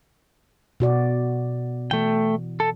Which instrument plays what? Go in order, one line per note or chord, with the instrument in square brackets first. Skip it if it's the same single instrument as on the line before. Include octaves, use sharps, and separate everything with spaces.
[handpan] B2 F#4 D5
[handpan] E3 [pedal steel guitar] A3 G5
[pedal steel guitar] A4